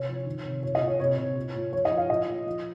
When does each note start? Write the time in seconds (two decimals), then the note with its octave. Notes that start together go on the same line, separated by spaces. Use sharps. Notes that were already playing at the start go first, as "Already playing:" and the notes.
Already playing: C3 C#5
0.08 F3
0.26 D#3
0.45 C3
0.63 A#2 C#5
0.75 D#5
0.82 A#2
0.88 C#5
0.99 C3 C#5
1.18 C3
1.36 A#2
1.55 A#2
1.73 F3 C#5
1.85 D#5
1.91 F3
1.97 F5
2.10 A#2 D#5
2.28 F3
2.47 F3